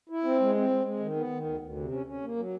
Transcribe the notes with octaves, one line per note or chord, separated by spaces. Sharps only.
E4
C4
G#3
C4
G#3
G#3
D#3
B3
D#3
D2
D2
C3
C#4
C#4
A#3
F#3